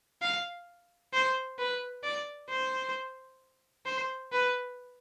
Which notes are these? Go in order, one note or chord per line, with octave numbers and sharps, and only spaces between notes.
F5
C5
B4
D5
C5
C5
B4